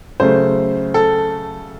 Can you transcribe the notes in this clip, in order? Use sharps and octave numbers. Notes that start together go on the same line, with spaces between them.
C#3 F#3 A3 C5
A4